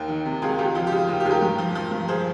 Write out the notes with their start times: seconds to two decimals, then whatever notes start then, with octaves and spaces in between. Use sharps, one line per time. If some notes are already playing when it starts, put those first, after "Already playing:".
Already playing: D#2 A#4
0.08 D#3
0.25 C3
0.42 C#2 F4 G#4
0.58 C#2 G4
0.75 F3 F4
0.87 G4
0.92 C#3
0.97 F4
1.08 D#2 F4
1.20 G4
1.25 D#2 G#4
1.30 G4 A#4
1.42 G2
1.58 F3
1.75 F3
1.91 G2
2.08 F3 G#4 C5